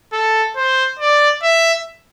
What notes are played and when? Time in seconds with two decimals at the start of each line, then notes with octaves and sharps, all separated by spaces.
0.13 A4
0.56 C5
0.99 D5
1.43 E5